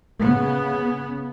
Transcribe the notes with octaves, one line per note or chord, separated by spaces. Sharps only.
C#3 B3